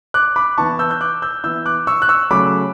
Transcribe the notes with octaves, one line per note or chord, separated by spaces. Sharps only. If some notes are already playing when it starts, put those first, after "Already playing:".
D6 F#6
B5 D6
E3 B3 E4 A5 C#6
E6 G6
G6
D6 F#6
E6 G6
E3 B3 E4 E6 G6
D6 F#6
C#6 E6
F#6
C#6 E6
C#3 F#3 A3 B5 D6